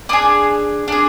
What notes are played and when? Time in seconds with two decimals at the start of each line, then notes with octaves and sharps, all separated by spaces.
0.09 D4 G#4 D#6
0.88 D4 G#4